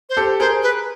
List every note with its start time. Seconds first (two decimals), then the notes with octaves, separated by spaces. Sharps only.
0.10 C5
0.17 G4 A4
0.40 G#4 A#4 C5
0.63 B4